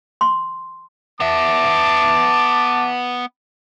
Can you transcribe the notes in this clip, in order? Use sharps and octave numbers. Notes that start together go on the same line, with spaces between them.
C6
B3 E5 A5 D6